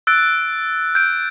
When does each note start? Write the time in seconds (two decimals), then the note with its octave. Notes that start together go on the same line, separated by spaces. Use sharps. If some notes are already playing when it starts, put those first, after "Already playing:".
0.07 E6 F#6 A6 D7
0.95 G6 D7